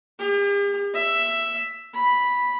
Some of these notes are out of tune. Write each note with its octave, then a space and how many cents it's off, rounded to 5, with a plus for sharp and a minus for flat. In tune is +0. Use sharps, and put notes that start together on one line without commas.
G4 +45
E5 +5
B5 -5